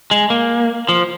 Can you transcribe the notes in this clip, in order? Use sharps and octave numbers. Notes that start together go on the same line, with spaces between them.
G#3
A#3
F3